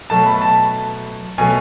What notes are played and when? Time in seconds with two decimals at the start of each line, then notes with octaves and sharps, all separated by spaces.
0.10 B2 F#3 A3 A5
0.26 B5
0.42 A5
1.38 B2 F#3 A3 G#5